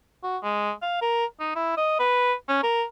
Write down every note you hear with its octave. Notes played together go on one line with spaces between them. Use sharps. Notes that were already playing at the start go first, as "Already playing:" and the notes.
F#4
G#3
F5
A#4
D#4
E4
D#5
B4
C#4
A#4